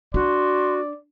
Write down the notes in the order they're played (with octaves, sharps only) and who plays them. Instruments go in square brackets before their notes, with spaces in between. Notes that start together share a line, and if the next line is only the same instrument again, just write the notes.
[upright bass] D4 [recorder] F#4 [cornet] D5 [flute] C6